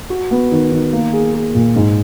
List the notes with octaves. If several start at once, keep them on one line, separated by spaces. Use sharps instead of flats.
F#4
B3
D#3
D#3
A#3
G#4
G#4
A#2
G#2